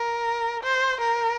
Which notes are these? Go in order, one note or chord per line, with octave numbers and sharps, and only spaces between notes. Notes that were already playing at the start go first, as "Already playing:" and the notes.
Already playing: A#4
C5
A#4